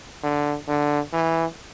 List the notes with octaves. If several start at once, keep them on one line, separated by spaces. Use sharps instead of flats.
D3
D3
E3